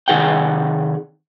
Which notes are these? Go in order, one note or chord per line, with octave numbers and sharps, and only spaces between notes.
C3 D#3 D#4 G#4 F#5 G5